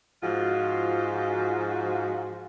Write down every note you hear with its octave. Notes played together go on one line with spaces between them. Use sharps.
G#2 F3 F4 F#4